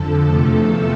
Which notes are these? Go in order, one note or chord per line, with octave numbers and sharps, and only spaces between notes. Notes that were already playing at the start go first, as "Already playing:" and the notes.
Already playing: F2 D3 F3 A4
E2 C3 F3 A3